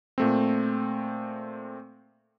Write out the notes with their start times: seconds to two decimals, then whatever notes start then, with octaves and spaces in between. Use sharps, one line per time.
0.18 A#2 A3 C4